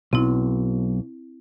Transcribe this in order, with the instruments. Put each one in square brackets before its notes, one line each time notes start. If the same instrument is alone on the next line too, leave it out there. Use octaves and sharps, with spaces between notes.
[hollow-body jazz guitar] B1 [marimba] C4 E4